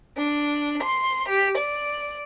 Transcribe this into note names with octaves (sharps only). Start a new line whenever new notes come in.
D4
C6
G4
D5